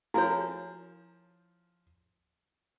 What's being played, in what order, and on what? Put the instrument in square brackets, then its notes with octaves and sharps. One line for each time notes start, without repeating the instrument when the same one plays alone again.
[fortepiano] F3 G#4 A#4 [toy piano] E4 F#4 C#5